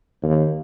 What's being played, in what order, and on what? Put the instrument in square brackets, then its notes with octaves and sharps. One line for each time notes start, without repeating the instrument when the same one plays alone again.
[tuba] D#2